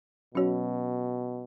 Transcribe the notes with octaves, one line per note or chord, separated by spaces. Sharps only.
B2 F#3 C#4 F#4 C#5